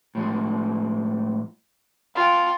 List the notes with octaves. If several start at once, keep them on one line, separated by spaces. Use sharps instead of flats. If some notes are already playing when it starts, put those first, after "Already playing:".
A2 F3 G#3
F4 F5 G5